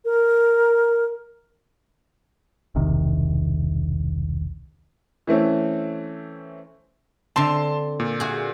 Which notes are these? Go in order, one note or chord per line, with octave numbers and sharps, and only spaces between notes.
A#4
E1 C2 C3 D#3
E3 A3 C4 C#4
D3 C4 A5 C6
A#2
F#4 G#4